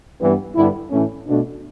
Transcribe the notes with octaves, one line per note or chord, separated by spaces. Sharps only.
G2 E3 G3 B3
G2 D3 G3 B3 E4
A2 E3 A3 C#4
B2 A3 D4